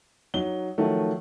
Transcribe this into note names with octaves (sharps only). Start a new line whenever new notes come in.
F#3 D#4 G7
D#3 F3 F#3 A3